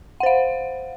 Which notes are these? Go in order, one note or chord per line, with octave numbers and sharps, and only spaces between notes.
C5 F5 F#5